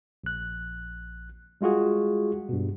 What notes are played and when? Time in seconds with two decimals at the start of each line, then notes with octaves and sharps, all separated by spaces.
0.24 A#1 F#6
1.61 G3 G#3 F4 F#4 G#4
2.49 G2 B2